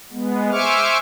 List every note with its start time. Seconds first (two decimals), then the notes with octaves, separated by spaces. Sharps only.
0.12 G#3 B3
0.51 C5 E5 G#5 C#6 D6 F6